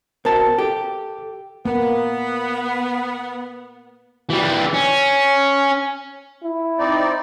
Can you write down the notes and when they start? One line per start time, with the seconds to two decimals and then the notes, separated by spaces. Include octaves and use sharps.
0.25 B2 A#4 C5 A5
0.58 G4 A4
1.65 A#3 B3
4.30 E3 G3
4.74 C#4
6.43 E4
6.79 C4 D#4 D5